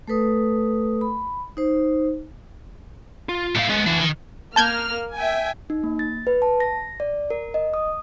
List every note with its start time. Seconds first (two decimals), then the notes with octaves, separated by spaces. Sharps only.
0.07 A3 A4 B4 D#6
1.01 B5
1.57 D#4 C5
3.29 F4
3.55 B1 A3 E4 F5
3.69 G#3 B3 C#4
3.86 E3 D4 F#4
3.98 D#3
4.56 A#3 A5 F6 G6 G#6
5.13 E5 G5 G#5
5.70 D#4
5.83 A#3
5.99 A6
6.27 B4
6.42 A5
6.60 A#6
7.00 D5
7.30 A#4
7.54 D#5
7.74 D#6